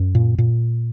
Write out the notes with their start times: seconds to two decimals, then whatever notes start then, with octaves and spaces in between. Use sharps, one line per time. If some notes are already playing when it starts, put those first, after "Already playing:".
Already playing: F#2
0.15 A#2
0.38 A#2